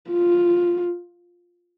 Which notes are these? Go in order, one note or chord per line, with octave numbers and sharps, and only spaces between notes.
F4